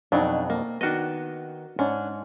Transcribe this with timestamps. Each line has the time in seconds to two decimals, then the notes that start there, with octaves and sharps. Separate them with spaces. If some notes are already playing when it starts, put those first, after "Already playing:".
0.12 F2 B2 F#3 D4 D#4
0.50 A#3
0.81 D#3 B3 D4 F#4 D#5
1.79 G#2 C#4 D4